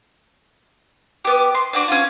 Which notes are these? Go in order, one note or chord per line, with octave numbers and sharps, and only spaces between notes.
B3 G4
C6
D4 F#4 D5
C#4 F4